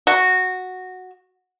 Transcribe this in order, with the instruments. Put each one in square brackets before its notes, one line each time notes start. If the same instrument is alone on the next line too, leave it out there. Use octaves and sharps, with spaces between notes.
[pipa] F#4